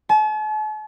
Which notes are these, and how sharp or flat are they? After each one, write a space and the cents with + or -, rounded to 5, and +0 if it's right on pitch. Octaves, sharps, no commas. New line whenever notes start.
A5 -45